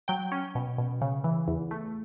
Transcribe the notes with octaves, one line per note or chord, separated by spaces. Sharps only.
F#3 G5
C#4
B2
B2
C#3
E3
E2
A3